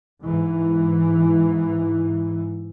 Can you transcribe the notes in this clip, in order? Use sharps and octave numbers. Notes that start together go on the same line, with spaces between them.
G#2 E3